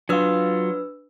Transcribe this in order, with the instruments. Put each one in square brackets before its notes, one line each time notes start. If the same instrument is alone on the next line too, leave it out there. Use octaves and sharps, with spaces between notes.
[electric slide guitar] F#3 F4 [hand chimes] D4 B4 E6